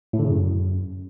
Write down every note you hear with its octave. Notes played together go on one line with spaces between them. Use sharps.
A2
D3
C#3
F#2